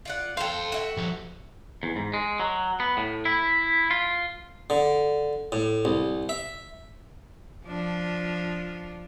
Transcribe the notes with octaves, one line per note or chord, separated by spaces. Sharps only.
F4 D5 F#5
A4 A#4 C5 F5 G5
F#4 E5
F3 G3
E2
G#2
G#3
F#3
B3
A2
E4
F4
D3
A2
C2
E5
F3 D4 F4